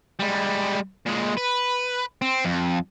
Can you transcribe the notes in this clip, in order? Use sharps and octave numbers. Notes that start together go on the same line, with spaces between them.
G3 G#3
A#2 G#3
B4
C4
F2